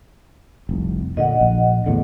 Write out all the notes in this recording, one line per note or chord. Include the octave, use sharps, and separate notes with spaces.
F1 C2
A#2 D3 D#5 F#5
A#1
E2 A2 D3